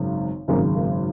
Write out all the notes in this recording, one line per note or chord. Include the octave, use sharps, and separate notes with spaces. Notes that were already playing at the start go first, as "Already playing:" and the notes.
Already playing: G#1 F#2 C#3
G#1 F#2 C#3 A#3 C#4
A#3